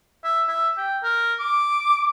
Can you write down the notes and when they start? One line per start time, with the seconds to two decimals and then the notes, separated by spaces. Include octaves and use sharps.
0.24 E5
0.48 E5
0.78 G5
1.04 A#4
1.40 D6